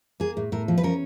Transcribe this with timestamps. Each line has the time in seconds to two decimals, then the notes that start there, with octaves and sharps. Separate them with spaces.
0.20 A#3 G#4
0.37 A2
0.52 A2 A#4
0.68 F3
0.78 B4
0.83 C#4 A#4